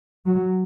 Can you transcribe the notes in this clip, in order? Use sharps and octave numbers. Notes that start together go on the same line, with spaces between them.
F#3